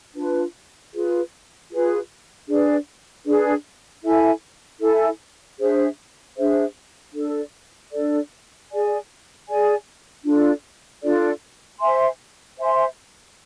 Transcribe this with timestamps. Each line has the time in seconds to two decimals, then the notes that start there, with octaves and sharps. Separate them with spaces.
0.15 D4 F4 B4
0.92 F4 G#4 B4
1.70 F4 G#4 B4
2.48 D4 G#4 B4 D5
3.25 D4 G#4 B4 D5
4.03 E4 A4 E5 G#5
4.81 E4 A4 E5 G#5
5.59 D4 G#4 C5 E5
6.36 D4 G#4 C5 E5
7.14 D4 A4 D5
7.92 D4 A4 D5
8.69 G#4 D5 G#5
9.47 G#4 D5 G#5
10.24 D4 F4 A4 D5
11.02 D4 F4 A4 D5
11.79 C5 E5 G#5 C6
12.58 C5 E5 G#5 C6